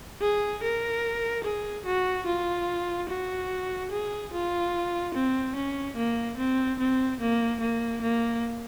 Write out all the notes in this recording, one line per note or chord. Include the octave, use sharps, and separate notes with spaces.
G#4
A#4
G#4
F#4
F4
F#4
G#4
F4
C4
C#4
A#3
C4
C4
A#3
A#3
A#3